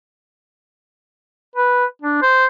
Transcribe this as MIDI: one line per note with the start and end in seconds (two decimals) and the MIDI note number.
1.55 1.85 71
2.02 2.17 62
2.22 2.46 72